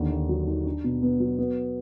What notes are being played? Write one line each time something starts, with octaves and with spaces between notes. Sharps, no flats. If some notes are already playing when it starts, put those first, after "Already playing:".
Already playing: D#2 D3
D#2
F#3
D#3
D4
B2
B3
F#3
B3